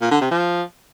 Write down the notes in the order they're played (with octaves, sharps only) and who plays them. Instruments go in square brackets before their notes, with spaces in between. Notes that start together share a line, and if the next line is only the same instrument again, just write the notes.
[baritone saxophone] A#2
D3
C3
F3